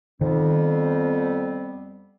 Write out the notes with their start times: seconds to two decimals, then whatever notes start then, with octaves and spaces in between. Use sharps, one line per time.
0.21 F2 D#3 G3 B3 C4